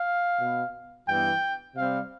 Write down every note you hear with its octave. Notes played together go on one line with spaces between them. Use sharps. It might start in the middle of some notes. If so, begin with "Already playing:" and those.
Already playing: F5
B2 B3
G2 E3 B3 G5
C3 G3 C4 F5